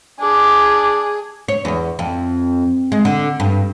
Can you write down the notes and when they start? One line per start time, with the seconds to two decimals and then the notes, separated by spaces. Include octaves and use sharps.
0.20 D4 G#4 D6
1.48 C#5
1.65 E2
1.99 F2
2.92 G#3
3.05 D3
3.40 G2